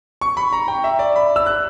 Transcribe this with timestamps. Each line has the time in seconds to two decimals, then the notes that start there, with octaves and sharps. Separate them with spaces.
0.21 C#6
0.37 B5
0.53 A#5
0.68 G5
0.84 E5
0.99 D5
1.16 B5
1.36 E6
1.46 F#6